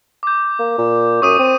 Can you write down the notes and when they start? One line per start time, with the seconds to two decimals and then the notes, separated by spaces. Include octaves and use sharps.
0.23 D6 G6
0.59 A#3
0.78 A#2
1.22 F#2 C#6 D#6 D#7
1.39 C4